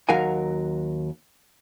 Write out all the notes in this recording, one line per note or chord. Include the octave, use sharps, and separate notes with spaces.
D#2 F#3 F#4 A#4 F5 G#5